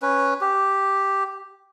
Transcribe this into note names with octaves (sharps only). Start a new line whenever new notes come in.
C#4 B4
G4